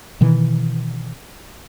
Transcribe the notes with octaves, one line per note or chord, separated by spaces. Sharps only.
B2 D#3 E3